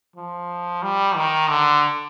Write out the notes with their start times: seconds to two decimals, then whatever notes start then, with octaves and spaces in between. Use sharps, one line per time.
0.16 F3
0.82 G3
1.16 D#3
1.49 D3